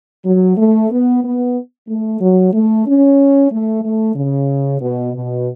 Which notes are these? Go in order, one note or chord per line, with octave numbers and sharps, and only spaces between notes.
F#3
A3
B3
B3
A3
F#3
A3
C#4
A3
A3
C#3
B2
B2